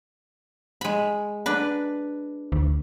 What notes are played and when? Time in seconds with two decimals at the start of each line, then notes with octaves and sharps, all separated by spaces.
0.81 G#3 B5
1.46 D4 B4
2.52 D2